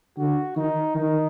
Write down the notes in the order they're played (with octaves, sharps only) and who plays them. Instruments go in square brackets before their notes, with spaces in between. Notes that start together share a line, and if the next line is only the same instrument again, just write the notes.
[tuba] D3 [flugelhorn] F#4
[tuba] D#3 [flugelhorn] D#4
[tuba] D#3 [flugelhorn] D#4